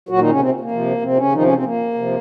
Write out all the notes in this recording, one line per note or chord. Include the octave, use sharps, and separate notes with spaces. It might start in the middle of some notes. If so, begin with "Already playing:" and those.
A#2 F#3 F#4
D#3 D#4
C#3 C#4
C3 C4
A#3
C3 F3
C3 C4
C#3 C#4
C3 D#3 F3 D#4
C#3 C#4
C3 C4
A#3
C3 F3